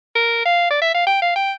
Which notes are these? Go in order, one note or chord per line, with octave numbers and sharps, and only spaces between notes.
A#4
F5
D5
E5
F5
G5
F5
G5